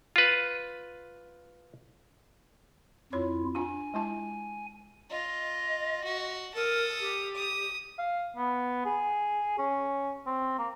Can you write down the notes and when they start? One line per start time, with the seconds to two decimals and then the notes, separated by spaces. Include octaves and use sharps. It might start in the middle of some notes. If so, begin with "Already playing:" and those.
0.16 F4 B4
3.13 F2 E4 F4 C#5
3.55 D4 F4 G#5
3.94 G#3 E4 A5
5.10 F4 D#5
6.04 F#4
6.55 A4 A#4 D#6
7.00 G4
7.35 D#6
7.98 F5
8.36 B3
8.85 G#4
9.58 C#4
10.26 C4
10.58 A#3